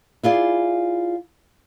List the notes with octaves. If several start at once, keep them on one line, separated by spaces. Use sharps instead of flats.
E4 F4 G#4 D5